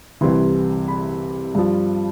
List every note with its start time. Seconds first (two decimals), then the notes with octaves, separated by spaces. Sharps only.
0.21 C2 C3 E3 C6
0.88 B5
1.55 G2 F3